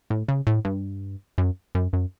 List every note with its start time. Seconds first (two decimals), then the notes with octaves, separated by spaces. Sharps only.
0.10 A2
0.28 C#3
0.47 A2
0.65 G2
1.38 F#2
1.75 F#2
1.93 F#2